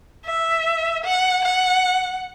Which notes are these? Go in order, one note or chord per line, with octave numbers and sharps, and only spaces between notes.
E5
F#5
F#5